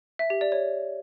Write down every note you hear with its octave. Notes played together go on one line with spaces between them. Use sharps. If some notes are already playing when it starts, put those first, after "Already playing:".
E5
G4
D5
C#5